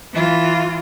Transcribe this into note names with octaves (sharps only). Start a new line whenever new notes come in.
E3 F4